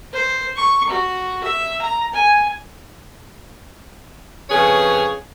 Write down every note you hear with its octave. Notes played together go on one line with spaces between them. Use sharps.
C5
C#6
F#4
E5
A#5
G#5
F2 C#3 G#4 B4 C#5